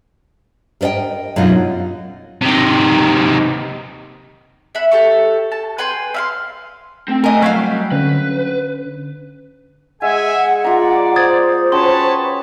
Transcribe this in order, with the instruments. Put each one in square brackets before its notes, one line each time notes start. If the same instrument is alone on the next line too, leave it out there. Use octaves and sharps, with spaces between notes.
[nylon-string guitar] A#4 B4 D5 D#5 G5
F#2 B2 F#3 D#4 F4 F#4
[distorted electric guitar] C3 D#3
[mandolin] E5 F#5 B5
G4 A4 C#6
A5
B4 G5 G#5 C6
E5 F5 C6
[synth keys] A3 G5 [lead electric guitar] C4
[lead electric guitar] E4 G#5 [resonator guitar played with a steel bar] A#4 D#5
[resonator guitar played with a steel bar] F#3 C4 F5 [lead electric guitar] G3
[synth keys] D3 C#4 [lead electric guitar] B4
[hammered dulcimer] G#3 [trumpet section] G#4 E5 G#5 [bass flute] F#5
[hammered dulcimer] F4 A#5 [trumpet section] D5
[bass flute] C5 [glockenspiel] D#6 G#6 A6
[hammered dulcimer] C#4 F#4 G5 [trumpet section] B4 C#5 A5 [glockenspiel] C6